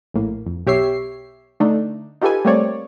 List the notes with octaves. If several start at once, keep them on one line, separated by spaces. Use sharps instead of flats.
A#1 A2 A#3
F2
B1 B2 G4 C#5 E5 C7
D3 A3 D4 D#4
D#4 F4 G4 A4 B4 G#5
G3 A3 A#3 C4 C#5 D5